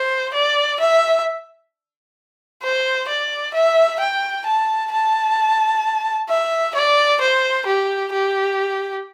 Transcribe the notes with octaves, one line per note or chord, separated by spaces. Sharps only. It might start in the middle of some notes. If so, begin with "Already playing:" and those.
Already playing: C5
D5
E5
C5
D5
E5
G5
A5
A5
E5
D5
C5
G4
G4